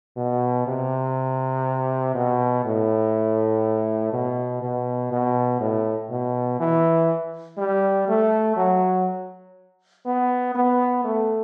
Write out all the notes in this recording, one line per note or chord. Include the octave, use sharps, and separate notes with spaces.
B2
C3
B2
A2
B2
B2
B2
A2
B2
E3
G3
A3
F#3
B3
B3
A3